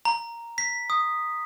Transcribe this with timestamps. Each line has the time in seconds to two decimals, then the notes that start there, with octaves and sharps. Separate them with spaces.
0.05 A#5
0.58 B6
0.90 D#6